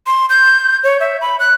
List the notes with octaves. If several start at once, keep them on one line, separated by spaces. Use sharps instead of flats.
C6
G6
C#5
E5
B5
F#6